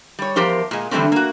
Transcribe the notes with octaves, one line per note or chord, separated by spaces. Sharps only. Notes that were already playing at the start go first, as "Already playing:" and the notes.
G3 C#5
E2 F3 G4 A#4 C5
A#2 G#3
D3 E3 G3 A3 C4 C#4
A#3 F#4